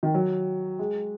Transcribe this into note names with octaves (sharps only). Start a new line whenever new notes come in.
D#3
F#3
G#3